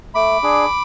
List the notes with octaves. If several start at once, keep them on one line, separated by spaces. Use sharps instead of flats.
A3 B5 D6
D4 G#4